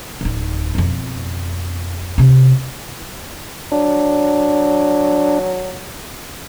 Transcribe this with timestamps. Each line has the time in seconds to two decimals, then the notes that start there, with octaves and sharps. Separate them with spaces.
0.21 D1 D#4
0.75 F2 B2
2.18 C3 C#4
3.72 F#3 D4